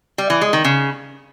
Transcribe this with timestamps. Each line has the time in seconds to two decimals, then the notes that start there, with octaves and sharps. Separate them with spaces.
0.18 G3
0.30 E3
0.41 G#3
0.53 D#3
0.64 C#3